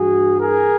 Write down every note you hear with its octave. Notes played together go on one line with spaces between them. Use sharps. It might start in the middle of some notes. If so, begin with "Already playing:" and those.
Already playing: G2 E3 F#4 G#4
G#4 A#4